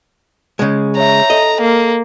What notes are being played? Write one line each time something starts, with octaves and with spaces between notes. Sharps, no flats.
C#3 G#3
C#5 E5 A#5
A4 D#5
A#3